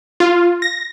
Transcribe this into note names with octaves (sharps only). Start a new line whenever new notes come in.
F4
A#6